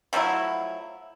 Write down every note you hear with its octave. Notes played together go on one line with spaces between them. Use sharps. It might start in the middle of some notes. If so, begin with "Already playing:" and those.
F3 F#3 A3 E4